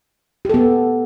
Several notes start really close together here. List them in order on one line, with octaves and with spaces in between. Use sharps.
G4 A4 B3